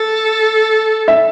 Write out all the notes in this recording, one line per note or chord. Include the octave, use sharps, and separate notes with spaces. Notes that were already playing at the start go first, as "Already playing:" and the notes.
Already playing: A4
E5